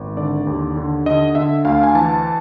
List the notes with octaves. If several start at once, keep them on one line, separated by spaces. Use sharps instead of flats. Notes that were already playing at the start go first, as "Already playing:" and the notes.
Already playing: G#1
D3 D5
D#2
D3
D3 D#5
D3 E5
D2 F5
G#5
E3 A5